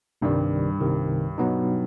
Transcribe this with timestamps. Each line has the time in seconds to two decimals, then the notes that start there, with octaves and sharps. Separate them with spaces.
0.22 C2 G2 C3 D#3 G3
0.80 C2 C3 D#3
1.38 B2 F#3 B3 D#4